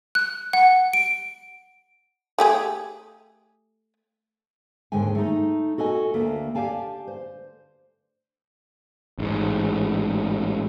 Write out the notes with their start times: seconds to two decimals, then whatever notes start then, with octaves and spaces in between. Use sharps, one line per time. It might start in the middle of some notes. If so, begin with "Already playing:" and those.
0.15 F#6
0.53 F#5
0.93 D7
2.39 A3 G4 G#4
4.92 D#2 G#2 D3 G#3 G5 G#5
5.15 A3 D#4
5.78 F#4 A4 D#5 G#5
6.14 D2 A3 A#3
6.55 G4 D5 F5 G#5 A5
7.07 C5
9.19 A1 G#2